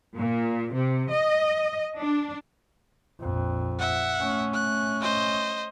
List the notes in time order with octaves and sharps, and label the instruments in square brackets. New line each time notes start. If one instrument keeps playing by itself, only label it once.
[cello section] A#2
C3
D#5
D4
[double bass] A#1 F2
[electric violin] E5 F#5
[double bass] A3 C#4
[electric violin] F#6
C5 D#5